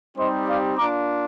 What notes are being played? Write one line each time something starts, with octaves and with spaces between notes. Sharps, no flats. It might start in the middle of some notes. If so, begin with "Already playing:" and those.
G3 C4 D#4 G4 C5 D#5
D5 F5
A#3 D4 F4 A#5 D6